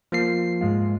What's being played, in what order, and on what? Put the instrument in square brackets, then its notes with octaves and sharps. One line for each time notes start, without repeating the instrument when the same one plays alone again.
[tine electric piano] F3 A#3 C7
[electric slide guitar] G#2 G#3 F4